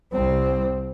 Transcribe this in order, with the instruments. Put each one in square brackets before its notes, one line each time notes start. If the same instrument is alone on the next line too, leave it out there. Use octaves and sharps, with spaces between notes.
[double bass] C2 C4